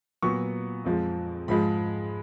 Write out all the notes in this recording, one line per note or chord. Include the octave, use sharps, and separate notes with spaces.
A#2 F#3 B3 C#6
F2 F3 G#3
G#2 F3 G#3 B5